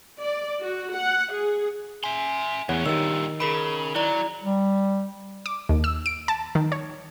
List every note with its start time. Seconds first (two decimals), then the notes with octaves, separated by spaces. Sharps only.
0.19 D5
0.60 F#4
0.95 F#5
1.33 G#4
2.04 E5 G#5 C6
2.69 E2 A2 C#4 C#5 F#5
2.86 G2 A#2 D#3 G4 E6
3.40 C#3 G#4 A#4 B5
3.95 F#3 E4 D5 A#5
4.44 G3
5.46 D6
5.69 D#2
5.84 E6
6.06 D7
6.28 A5
6.55 D#3
6.72 C#5